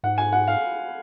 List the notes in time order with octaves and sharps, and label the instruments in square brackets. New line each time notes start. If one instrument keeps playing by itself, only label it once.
[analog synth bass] G#2 [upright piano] F#5
[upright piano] G#5
F#5
F5